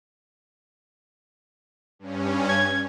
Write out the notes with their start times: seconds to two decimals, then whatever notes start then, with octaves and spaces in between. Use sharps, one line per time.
1.99 G2 C#4
2.49 G#6